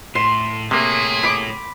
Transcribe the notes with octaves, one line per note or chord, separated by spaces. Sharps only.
A2 C6
C3 A3 A#3 G#4 C#5
B5 D6